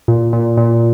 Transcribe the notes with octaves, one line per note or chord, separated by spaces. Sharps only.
A#2
A#2
A#2